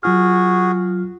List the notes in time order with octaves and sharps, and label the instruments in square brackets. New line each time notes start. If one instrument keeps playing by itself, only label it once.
[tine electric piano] F#3 F4 F6 [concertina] F#4 G#4